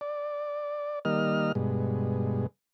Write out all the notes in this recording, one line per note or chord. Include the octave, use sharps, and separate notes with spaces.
D5
D#3 G3 A#3 D#5 F6
G2 B2 G#3